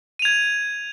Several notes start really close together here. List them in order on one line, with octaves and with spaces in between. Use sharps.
D#7 F7 G#6